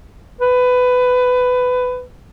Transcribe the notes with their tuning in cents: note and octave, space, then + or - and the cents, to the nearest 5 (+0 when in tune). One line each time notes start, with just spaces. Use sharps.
B4 +15